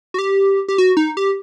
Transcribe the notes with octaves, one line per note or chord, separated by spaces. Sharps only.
F#4
G4
G4
F#4
D#4
G4